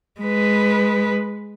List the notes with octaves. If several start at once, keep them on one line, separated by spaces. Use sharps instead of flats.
G#3 B4